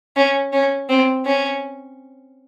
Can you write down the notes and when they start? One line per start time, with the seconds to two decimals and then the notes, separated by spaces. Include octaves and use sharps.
0.16 C#4
0.53 C#4
0.89 C4
1.25 C#4